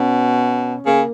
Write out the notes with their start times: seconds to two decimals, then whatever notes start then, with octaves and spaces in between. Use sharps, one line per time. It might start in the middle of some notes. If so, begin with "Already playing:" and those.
Already playing: B2 C#4
0.86 C#3 A#3